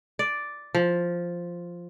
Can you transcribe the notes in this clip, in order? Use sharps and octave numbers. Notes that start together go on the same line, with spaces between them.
D5
F3